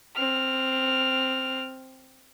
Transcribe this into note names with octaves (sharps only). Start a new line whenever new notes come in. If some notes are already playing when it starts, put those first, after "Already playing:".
C4 F6